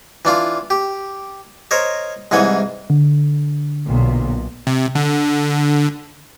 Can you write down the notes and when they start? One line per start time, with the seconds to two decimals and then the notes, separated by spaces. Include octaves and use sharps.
0.25 E3 D4 F4
0.70 G4
1.71 A#4 C5 C#5 D#5
2.31 C2 G#2 E3 F#5 G#5 D#6
2.90 D3
3.86 B1 A#2
4.67 C3
4.95 D3